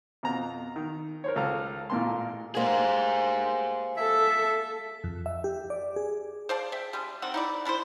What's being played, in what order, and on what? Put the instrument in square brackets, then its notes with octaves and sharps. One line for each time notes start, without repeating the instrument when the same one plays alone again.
[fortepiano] F2 B2 A#5
D#3
A#4 C5 C#5
C#2 A4 F5 A#5 F6
A1 A#2 A#3 A5 C6
[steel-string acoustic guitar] G#3 A#3 G4 [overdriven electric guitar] G#4 C5
[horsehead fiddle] A4 [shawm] E5
[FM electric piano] F2
E5
G4
D5
G#4
[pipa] C5 D5 F5 A5
E5 G5
G3 G#3 D4
D3 D#3 C4 F#5
D#4 E4 D5
D4 E4 A4 C5